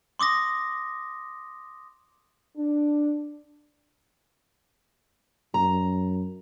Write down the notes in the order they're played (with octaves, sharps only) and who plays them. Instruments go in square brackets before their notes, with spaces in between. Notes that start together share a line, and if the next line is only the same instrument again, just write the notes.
[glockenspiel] C6 D6 D#6 A#6
[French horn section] D4
[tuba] F#2 [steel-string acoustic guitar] A#5